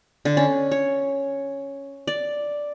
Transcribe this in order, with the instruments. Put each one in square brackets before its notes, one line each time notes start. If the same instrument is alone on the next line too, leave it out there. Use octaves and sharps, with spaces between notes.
[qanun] D3
C#4
C#5
D5